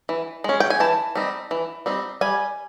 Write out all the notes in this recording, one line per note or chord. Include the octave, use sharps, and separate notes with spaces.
E3
G#3 C#4
G5
G#5
E3 A5
G3 C4 D#4
E3
G3 C4 D#4
G3 G#5